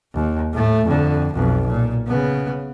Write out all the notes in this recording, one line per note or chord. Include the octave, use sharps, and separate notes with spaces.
D#2
A2 A3
F2 D3
B1 F2
A#2
C#3 B3